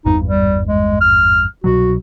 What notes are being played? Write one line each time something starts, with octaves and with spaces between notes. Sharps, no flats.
G#1 E2 G2 D#4
G3
G#3
F6
C2 B2 F#3 F#4